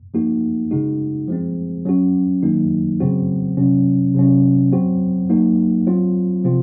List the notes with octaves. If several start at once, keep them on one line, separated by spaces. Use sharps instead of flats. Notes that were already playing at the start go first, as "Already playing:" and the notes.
F3 A#3 D#4 F#4
C#3 G#3 D#4 F#4
F3 G#3 C4
F#3 C#4 F#4
D#3 F#3 A#3 D#4
C#3 F#3 C4 F#4
C3 F#3 C#4
C3 F#3 C#4
F#3 C4 F#4
F#3 A#3 D#4 F#4
F#3 C4 F4
C3 F3 C4 F4